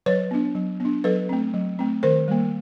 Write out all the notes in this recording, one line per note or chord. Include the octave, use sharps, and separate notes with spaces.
F#3 B4 C#5
B3 D4
F#3
B3 D4
F#3 A4 B4
A3 C4
F#3
A3 C4
D#3 A#4 C5
G3 A#3